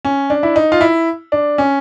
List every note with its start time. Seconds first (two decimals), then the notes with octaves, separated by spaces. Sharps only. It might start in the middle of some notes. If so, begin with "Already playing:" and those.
0.05 C#4
0.30 D4
0.43 E4
0.56 D#4
0.72 F4
0.81 E4
1.32 D4
1.58 C#4